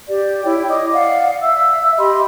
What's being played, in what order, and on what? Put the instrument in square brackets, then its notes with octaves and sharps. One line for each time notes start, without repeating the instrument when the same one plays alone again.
[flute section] G4 D5
E4 C#5 G5
D#5 D6 D#6
D5 F5 F#5
E5 E6
G4 D#5 B5 C6